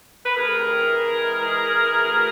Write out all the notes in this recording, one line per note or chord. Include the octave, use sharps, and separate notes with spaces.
B4
D2 G#4 A#4
C3
E3
E3
G#3
E3
E3
E3
D2